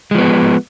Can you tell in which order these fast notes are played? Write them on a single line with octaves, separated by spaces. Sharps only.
G#3 F3 B3